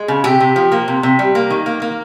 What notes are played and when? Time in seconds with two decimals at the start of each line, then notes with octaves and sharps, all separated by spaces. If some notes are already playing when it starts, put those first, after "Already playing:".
Already playing: G#3
0.08 C#3
0.24 C3 G4
0.40 C3
0.56 F3
0.72 A#3
0.88 C3
1.03 C3
1.19 G3
1.35 A#3
1.50 D#3
1.66 A#3
1.82 A#3